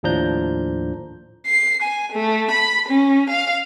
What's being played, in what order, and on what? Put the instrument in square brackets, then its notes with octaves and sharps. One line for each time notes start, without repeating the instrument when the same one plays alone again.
[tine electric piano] D#2 A2 F3 D4 A#5 G6
[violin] C7
G#5
A3
B5
C#4
F5